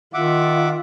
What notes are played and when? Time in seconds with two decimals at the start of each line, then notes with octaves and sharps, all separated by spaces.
0.14 D#3 F4 E5 F#5 D6